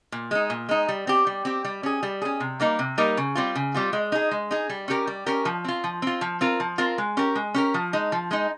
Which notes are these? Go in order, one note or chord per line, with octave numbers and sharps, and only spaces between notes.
A#2
G#3 D#4
A#2
G#3 D#4
G3
C4 G4
G3
C4 G4
G3
C#4 G#4
G3
C#4 G#4
C3
G3 A#3 D#4 A#4
C3
G3 A#3 D#4 A#4
C#3
G3 C4 F4
C#3
G3 C4 F4
G#3
D#4 G#4
G#3
D#4 G#4
G3
C#4 G4 A#4
G3
C#4 G4 A#4
F3
C4 F4
F3
C4 F4
F3
C4 F4 A#4
F3
C4 F4 A#4
G#3
C#4 G4 A#4
G#3
C#4 G4 A#4
F3
G#3 D#4
F3
G#3 D#4